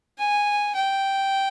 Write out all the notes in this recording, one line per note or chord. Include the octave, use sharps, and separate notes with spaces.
G#5
G5